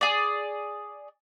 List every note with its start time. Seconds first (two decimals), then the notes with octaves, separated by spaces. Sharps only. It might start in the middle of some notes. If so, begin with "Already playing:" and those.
0.01 G#4 D5